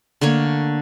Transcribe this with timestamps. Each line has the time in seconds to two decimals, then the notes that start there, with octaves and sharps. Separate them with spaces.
0.21 D3 A3 A#3 C#5